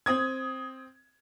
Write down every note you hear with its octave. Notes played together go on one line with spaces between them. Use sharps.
C4 D#6 G#6